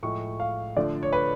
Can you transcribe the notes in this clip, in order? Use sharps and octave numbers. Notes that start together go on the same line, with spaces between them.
A2 F3 G#3 C#6
F5
D3 F3 A3 D5
C#5
B4